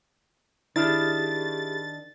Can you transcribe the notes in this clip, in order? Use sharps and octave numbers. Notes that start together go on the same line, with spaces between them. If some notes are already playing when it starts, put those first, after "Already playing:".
D#3 D4 E4 G4 G#4 A6